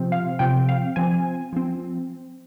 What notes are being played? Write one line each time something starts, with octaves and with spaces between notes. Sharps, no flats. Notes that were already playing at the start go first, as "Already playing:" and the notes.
Already playing: C3 F3 C4
F5
C3 F3 C4 G5
F5
F3 C4 G#5
F3 C4